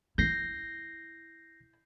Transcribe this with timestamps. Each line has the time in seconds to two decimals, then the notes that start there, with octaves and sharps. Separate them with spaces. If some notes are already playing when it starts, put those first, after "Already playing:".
0.18 E4 G6 A#6 C7